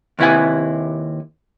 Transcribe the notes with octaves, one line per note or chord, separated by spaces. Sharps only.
D#2 C3 E4 B4 G#5